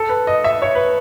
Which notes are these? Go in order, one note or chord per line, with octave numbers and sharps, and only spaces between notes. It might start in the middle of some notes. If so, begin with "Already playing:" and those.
Already playing: A4
B4
D#5
E5
C#5
B4